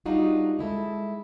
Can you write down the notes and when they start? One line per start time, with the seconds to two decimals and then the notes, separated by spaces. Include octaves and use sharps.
0.06 G3 D4 D#4 F4 F#4
0.59 G#3 E4 A4